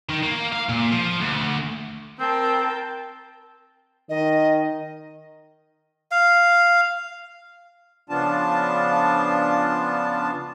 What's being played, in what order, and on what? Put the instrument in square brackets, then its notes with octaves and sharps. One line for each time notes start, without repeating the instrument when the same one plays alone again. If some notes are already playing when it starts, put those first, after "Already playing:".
[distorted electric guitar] D#3
A#3
F5
A#2
F3
D2
[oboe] C4 [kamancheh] A#4 A5 [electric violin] G5
[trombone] D#3 [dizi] D#5
[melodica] F5
[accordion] C#3 F3 B3 D4 F4 A5